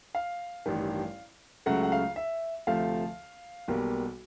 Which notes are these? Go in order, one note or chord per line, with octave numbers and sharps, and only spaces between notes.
F5
A1 G2 D#3
C#2 C#3 F#3 A3 F#5
F#5
F5
E5
D2 C3 F3 A3 F5
B1 B2 G3 A#3